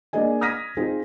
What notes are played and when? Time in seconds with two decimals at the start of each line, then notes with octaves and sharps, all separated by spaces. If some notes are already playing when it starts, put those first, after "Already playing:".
0.13 A#3 D4 G#4 D#5 G#5
0.41 D#6 F6 G#6 A#6 B6 D#7
0.77 C4 D#4 F4 G#4